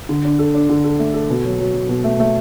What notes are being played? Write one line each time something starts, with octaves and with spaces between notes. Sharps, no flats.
D3
D4
A4
D4
D3
A4
A3
A4
B2
F#3
F#3
F#3
B2
A3
A3